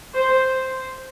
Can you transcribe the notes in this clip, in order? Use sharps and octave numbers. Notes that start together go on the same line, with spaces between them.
C5